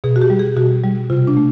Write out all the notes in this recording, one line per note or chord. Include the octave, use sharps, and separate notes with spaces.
B2 G#4
F#4
G4
G3
G#4
B2 F#4
G3
C3 F4
D4
A3